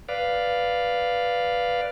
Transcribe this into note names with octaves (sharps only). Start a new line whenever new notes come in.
B4 D5 F5